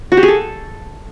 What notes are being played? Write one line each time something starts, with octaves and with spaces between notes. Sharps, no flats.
F#4
G4
G#4
A4